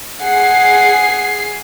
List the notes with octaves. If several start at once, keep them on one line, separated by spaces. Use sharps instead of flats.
G#4 F#5 C7